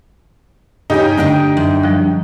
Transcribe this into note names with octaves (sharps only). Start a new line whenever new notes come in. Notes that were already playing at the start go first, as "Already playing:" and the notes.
G2 C#3 C#4 D#4 G4
D3 A3 D4 D#5 G5
F#2
F3 G3 F#6